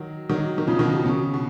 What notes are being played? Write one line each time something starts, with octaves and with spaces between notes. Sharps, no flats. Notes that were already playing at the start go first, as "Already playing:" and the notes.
Already playing: D#3 F#3
D#3 F#3
D#3
C#3 F3
B2 D#3
B2
C#3
B2